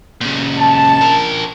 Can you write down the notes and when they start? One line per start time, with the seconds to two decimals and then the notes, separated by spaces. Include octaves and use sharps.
0.21 A#2 C#3
0.58 A5
1.01 D4 A#4